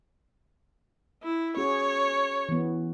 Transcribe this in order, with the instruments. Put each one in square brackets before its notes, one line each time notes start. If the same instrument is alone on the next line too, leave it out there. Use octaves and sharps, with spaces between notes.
[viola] E4
[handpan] C#4 F#4 G#4 [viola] C#5
[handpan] E3 B3